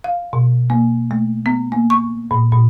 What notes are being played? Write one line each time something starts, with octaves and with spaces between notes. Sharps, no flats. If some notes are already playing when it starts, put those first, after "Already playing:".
F5
B2
A#3
A3
B3
A#3
C#6
A#2
A#2